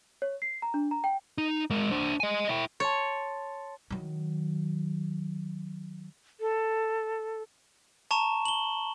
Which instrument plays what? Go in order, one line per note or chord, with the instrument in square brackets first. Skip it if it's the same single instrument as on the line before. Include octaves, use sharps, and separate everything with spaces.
[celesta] C#5
C7
A#5
D4
A#5
G5
[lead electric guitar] D#4
G#3 A#4
D4 C5
D#5 G#5
E4 G5
[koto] C#5 [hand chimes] A5 C6 A6
[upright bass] D#3 F#3
[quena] A4
[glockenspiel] A5 A#5 C#6 E7
F#7 G7